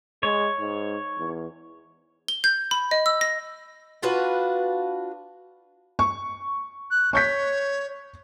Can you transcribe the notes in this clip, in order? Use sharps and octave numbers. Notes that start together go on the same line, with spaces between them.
G#3 C#5
G#2
E2
G7
G6
B5
D#5
E6
A#6
D4 F4 F#4 B4
C#6
F#6
C#5 C#6 G6 B6